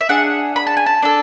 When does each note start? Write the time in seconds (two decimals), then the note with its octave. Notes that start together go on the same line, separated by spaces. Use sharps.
0.01 E5
0.09 D4 G#4 F#5
0.56 B5
0.67 A5
0.77 G#5
0.86 A5
1.02 D4 A4